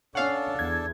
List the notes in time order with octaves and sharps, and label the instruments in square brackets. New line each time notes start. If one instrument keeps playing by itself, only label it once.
[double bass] C#4 [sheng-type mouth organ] D4 A4 [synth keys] F5 F#5
[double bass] E2 [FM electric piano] G#6